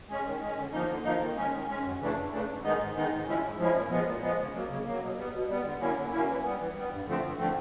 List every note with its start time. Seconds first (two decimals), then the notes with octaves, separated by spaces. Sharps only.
0.09 G#3 C#4
0.26 D#3
0.41 G#3 C#4
0.57 D3
0.72 F3 A#3 D#4
0.89 D3
1.04 F3 A#3 D#4
1.20 D#3
1.37 G#3 C#4
1.53 D#3
1.69 G#3 C#4
1.84 F#2
1.99 C#3 E3 A3 D4
2.15 F#2
2.31 C#3 E3 A3 D4
2.47 G#2
2.63 D#3 G#3 B3 D#4
2.78 G#2
2.95 D#3 G#3 B3 D#4
3.10 G#2
3.27 F3 G#3 C#4 E4
3.42 G#2
3.58 F3 G#3 C#4 E4
3.74 A#2
3.90 F3 G#3 B3
4.06 A#2
4.22 F3 G#3 B3
4.37 C#3
4.53 F#3 A#3
4.69 C#3
4.85 A#3
4.90 F#3
5.01 B2
5.17 G3 B3
5.33 B2
5.48 G3 B3
5.64 D3
5.80 F#3 A#3 C#4 E4
5.96 D3
6.11 F#3 A#3 C#4 E4
6.27 E3
6.44 G3 B3
6.59 E3
6.75 G3 B3
6.91 G2
7.06 D3 F3 A3 C4
7.23 G2
7.38 D3 F3 A3 C4